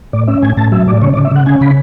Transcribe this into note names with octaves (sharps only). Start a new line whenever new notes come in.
A2 D5
C#4 E5
A2 G#5
A2 A5
F#3 E5
A2 D5
C#3 C#5
D5
C#3
E5
C#3 F#5
C#4 G#5
C#3 B5